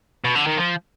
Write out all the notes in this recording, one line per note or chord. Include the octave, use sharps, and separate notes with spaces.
B2
D3
D#3
F3